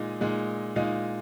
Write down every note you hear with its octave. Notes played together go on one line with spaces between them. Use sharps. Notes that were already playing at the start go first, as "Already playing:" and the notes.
Already playing: A#2 G#3 D#4 G#4
A#2 G#3 D#4
A#2 G#3 D#4 F5